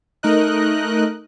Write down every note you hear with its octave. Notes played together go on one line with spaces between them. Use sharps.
A3 D#4 A#4 D#5 F#6